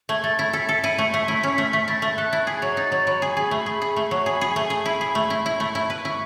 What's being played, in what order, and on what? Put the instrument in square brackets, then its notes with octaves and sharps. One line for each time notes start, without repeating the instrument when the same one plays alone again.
[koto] A3 [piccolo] G#6
[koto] A3 [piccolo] A6
[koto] E4 [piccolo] G#6
[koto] A4 [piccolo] B6
[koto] A4 [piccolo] C#7
[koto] E4 [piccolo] D#7
[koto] A3 [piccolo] C#7
[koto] A3 [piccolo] B6
[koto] E4
C#4
A3
A3
[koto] E4 [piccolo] A6
[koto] A3
[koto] A4 [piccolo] F#6
[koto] E4
[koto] G#4 [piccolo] G#6
[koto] F#3
[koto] D#4 [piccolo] A6
[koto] F#3
[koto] F#3 [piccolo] B5
[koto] G#4
G#4
A3
G#4
G#4
A3
F#3
[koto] G#4 [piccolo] B5
[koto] G#4
[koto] A3 [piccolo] G#5
[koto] G#4
[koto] E4 [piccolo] B5
[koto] G#4
A3
E4
E4
A3
E4
B4
[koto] E4 [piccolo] C#6